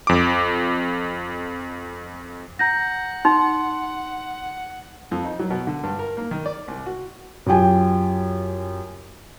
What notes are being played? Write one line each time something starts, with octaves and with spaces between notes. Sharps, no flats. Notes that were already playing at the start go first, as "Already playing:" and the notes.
F2 D6
F#5 A#5 G6 A#6
D#4 C6
F2
D#4
F#3
B2
D3
G2
A#4
A#3
D#3
D5
C2
F#4
F#2 F4 G4 G5 G#5